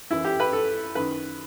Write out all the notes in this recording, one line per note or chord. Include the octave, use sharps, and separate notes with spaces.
F#2 E3 E4
G4
B4
A4
F#2 D#3 B4